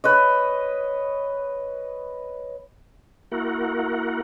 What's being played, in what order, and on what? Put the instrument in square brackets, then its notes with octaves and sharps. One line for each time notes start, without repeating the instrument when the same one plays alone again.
[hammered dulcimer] B4 C#5 D#5
[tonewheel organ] A#3 E4 F#4 A#4 F#5